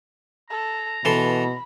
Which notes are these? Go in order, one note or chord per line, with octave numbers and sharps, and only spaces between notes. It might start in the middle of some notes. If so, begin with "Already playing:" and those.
A4 A#5
B2 E3 A4 B5 C6